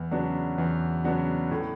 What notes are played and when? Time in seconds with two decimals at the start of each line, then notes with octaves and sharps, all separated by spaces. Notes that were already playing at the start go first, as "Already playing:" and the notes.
Already playing: E2
0.11 C#3 F#3 B3 D4
0.58 E2
1.04 C#3 F#3 B3 D4
1.51 A2